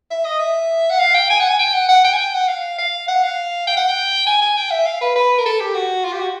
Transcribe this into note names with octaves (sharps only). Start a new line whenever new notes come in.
E5
D#5
E5
F#5
F5
G5
G#5
F#5
G#5
G5
F#5
F#5
G5
G#5
G5
F#5
F5
F5
F#5
F5
G5
F#5
G5
G#5
G#5
G5
E5
F5
B4
B4
A#4
A4
G4
F#4
F4
G4
F#4